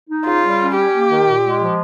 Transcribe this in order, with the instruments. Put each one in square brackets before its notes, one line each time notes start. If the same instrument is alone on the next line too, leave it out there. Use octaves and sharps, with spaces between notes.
[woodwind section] D#4
[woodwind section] C#3 [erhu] F4
[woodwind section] G3
C#4
[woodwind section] C#4 [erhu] G4
[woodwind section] A#3
D#3
A#2
G#3
F3